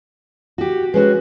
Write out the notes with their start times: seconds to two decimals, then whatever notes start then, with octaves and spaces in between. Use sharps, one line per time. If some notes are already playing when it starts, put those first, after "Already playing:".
0.58 F#4 G4
0.94 G#3 C#4 F#4 B4